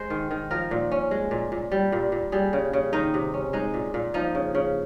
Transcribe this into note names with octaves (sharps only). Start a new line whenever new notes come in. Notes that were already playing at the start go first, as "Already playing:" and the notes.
Already playing: G#3 C5
D#3
D#3
F3 A#4
A#2
C#4
G#3
A#2
A#2
G3
A#2
A#2
G3 G#4
C#3
C#3
D#3 D#4
C3
C#4
G#3 D#4
A#2
A#2
F3 D#4
C#3
C#3